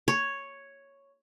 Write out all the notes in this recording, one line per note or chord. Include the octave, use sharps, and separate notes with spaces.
C#5